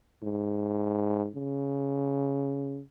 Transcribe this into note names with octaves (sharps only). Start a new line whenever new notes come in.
G#2
C#3